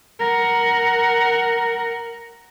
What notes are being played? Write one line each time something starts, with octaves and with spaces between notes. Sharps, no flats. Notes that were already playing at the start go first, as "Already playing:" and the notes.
A#4 F#5